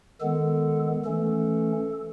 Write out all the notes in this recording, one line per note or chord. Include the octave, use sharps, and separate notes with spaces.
D#3 G#3 B3 A4
E3 A3 C#4 A4